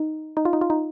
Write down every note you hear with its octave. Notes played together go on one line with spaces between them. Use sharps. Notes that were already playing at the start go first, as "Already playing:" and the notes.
Already playing: D#4
D#4
F4
D#4
F4
D#4